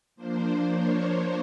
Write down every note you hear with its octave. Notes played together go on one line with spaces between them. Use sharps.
F3 A#3 D4 C5
C#5